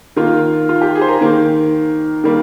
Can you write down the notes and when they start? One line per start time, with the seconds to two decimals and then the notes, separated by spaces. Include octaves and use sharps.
0.17 D#3 A#3 F4
0.69 F4
0.81 G4
0.95 G#4
1.02 C5
1.08 A#4
1.21 D#3 A#3
2.24 D#3 G3 A#3